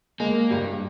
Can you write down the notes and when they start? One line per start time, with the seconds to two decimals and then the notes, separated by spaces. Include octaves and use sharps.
0.20 G#3 A#3
0.51 G2 G3